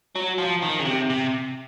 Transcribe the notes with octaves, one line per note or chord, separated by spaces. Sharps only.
F#3
F3
D#3
C#3
C3
C3